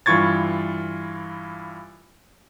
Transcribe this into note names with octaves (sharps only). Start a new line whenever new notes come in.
G2 E3 F4 C#6 G#6 A6